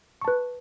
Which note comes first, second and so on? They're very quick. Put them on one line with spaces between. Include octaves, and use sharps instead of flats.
C#6 A5 B4